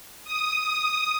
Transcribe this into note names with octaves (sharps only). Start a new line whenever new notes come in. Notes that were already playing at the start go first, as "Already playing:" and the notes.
D#6